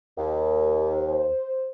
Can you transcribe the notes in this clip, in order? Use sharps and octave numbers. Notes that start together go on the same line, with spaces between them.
D#2
C5